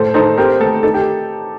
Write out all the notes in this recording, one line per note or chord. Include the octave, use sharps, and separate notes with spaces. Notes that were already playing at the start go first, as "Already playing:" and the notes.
Already playing: A2 A4 C5
D#4 A4 C5
C4 G4 A#4
A3 A4
D#4 A4
G4